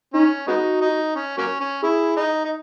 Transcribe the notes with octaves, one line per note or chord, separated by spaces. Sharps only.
C#4 D#4
G#3 B3 D#4 F#4
D#4
C#4
F#3 A#3 C#4
C#4
E4 G#4
D#4
D#4